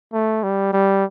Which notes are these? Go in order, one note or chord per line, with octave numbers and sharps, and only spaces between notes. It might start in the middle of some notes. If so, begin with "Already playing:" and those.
A3
G3
G3